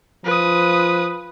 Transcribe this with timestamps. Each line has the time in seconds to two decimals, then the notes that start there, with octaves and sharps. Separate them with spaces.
0.25 F3 B4 D#6